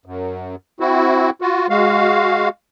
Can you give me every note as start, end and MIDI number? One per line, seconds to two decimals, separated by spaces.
0.06 0.55 42
0.80 1.30 60
0.80 1.30 64
0.80 1.30 66
1.41 1.67 65
1.41 1.67 66
1.69 2.49 56
1.69 2.49 66
1.69 2.49 77